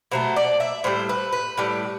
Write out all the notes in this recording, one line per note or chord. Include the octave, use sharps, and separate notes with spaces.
B2 F#3 A3 C5
D5
E5
A2 G3 C5
B4
B4
A2 G3